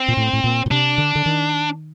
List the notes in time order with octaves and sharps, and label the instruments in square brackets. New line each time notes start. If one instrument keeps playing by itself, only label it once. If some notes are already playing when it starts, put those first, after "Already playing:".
Already playing: [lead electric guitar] C4
[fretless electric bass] A#2
A2
A2
A#2
A#2
[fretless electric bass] C3 [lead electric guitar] D4
[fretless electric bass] D3
D3
D#3